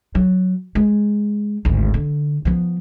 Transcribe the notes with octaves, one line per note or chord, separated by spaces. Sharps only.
F#3
G#3
G#1 D2
D3
F3 B3